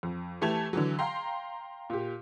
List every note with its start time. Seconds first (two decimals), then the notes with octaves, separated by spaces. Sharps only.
0.03 F2
0.41 E3 A3 G4 A5 G#6 F7
0.73 D3 E3 F#3
0.99 F5 G5 A#5 C6
1.90 A#2 G4